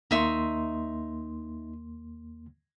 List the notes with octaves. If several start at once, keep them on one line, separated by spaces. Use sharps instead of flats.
D#2 A#3 D#4 E5 C6 C#6